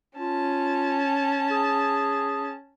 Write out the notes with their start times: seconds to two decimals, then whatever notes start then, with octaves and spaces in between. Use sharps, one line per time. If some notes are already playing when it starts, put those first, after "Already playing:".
0.19 C#4 F4 A5
1.51 G#4